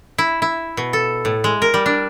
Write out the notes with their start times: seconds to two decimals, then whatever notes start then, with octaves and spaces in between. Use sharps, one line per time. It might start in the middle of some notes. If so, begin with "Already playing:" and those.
0.18 E4
0.42 E4
0.77 B2
0.93 A4
1.25 A2
1.44 G#3
1.62 A#4
1.74 G3
1.86 D4